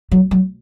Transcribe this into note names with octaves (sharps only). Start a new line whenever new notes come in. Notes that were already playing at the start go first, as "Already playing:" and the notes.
F#3
F#3